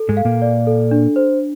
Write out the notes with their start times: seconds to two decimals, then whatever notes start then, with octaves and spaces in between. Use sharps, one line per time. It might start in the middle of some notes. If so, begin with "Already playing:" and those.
Already playing: A4
0.09 G#2 G#3
0.17 F5
0.25 A#2 A#3
0.42 D5
0.67 A4
0.91 D4
1.16 C5